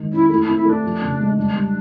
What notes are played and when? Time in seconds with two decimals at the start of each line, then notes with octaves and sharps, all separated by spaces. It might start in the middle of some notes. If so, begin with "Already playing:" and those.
Already playing: D#3 G#3
0.12 C#4 E4
0.29 A3 E4
0.43 C4 E4
0.57 E4
0.65 A3 D4
0.83 F3
1.01 C#3
1.20 G#3
1.37 G3 D4
1.55 G3